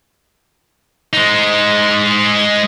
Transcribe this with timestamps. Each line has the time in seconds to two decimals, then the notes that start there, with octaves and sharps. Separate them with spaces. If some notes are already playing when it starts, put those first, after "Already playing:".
1.13 G#3 D#4